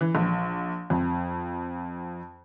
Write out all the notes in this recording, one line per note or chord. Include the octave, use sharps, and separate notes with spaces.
E3
A#1
F2